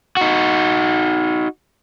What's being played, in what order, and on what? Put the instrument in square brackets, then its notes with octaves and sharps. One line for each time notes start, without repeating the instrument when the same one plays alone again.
[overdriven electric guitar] D#4 F#4